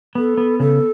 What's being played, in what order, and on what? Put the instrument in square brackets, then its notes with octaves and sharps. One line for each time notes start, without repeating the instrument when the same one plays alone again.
[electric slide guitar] B3 [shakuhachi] A4
[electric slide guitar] B3
[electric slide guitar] C#3 [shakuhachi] A4